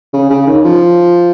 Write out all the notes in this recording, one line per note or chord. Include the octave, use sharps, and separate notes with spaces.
C#3
C#3
D#3
F3